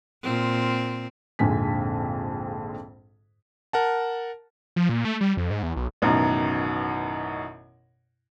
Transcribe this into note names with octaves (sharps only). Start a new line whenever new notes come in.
A#2 C4
A#1 F2 G#2 D3 G#5 B6
A#4 F#5 A5
F3
A#2
A3
G3
F2
G#2
E2
B1
A1 F#2 B2 D#3